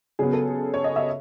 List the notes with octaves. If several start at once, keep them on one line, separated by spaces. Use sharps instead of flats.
C#3 F#3 B3 G#4
A4
C#5
D#5
E5